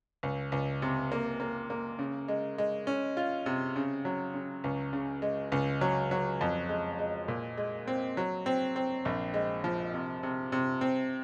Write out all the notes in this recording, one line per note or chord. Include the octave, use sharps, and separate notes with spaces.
C#2
C#2
C3
A#3
A#3
A#3
C#3
G#3
G#3
C#4
F4
C3
C#3
F#3
C#3
C#2
C#3
G#3
C#2
F#3
F#3
F2
G#3
G#3
A#2
G#3
C4
F#3
C4
C4
A#1
G#3
F3
C3
C3
C3
C4